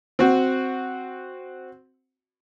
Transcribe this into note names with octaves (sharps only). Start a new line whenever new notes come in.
C4 F#4